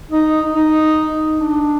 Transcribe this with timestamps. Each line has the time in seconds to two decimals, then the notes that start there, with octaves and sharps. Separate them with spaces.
0.11 D#4
0.54 D#4
1.39 D4